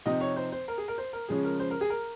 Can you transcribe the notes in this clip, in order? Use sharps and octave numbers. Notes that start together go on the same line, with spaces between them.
C3 F3 C4 D#4 D#5
C#5
C5
C5
A#4
G#4
A#4
C5
A#4
C#3 F3 G#3 C#4 G#4
A#4
C5
A#4
G#4
A#4